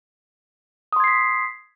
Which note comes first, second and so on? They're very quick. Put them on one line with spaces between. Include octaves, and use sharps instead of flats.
D#6 C6 G#6 C7 B6